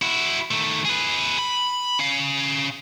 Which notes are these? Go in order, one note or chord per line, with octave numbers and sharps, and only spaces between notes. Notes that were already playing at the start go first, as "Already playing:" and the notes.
E4 F#4
D#3 A3
G#4 B4
B5
C#4 F5